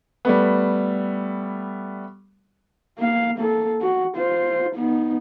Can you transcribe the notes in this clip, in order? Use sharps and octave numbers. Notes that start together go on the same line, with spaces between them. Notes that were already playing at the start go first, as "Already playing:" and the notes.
G3 A3 B3
A#3 F5
A#3 A4
F#4
F4 C5
B3 D#4